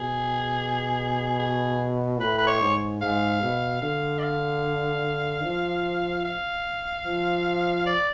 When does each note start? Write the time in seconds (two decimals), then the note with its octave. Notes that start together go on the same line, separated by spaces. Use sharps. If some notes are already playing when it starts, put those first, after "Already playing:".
Already playing: B2 G#4
1.39 G#4
2.20 A2 B4
2.38 B4
2.47 C#5
2.61 G#2
3.02 G#2 F5
3.42 B2
3.82 D3 F5
4.19 D5
4.23 F5
5.44 F3
6.25 F5
7.06 F3
7.87 D5